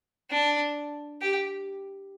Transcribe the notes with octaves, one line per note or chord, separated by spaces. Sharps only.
D4
G4